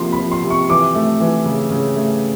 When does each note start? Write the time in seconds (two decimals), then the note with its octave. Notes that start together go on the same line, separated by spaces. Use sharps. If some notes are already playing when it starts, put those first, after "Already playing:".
Already playing: C3 F3 A#3 C6
0.12 B5
0.19 F3
0.32 C6
0.44 C3
0.50 C#6
0.69 E3 D6
0.95 A3
1.20 E3
1.46 C#3
1.71 C#3
1.96 A3